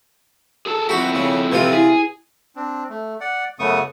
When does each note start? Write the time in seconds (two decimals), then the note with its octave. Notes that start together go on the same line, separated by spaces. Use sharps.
0.66 G#4 A4 A5
0.89 F2 C4 E4 F#4
1.15 C#3
1.52 C3 E3 F4 B4
1.72 E4 G#4
2.56 C4 D4
2.89 A3
3.21 D5 F#5
3.59 F#2 C#3 A3 B3 C#6 D#6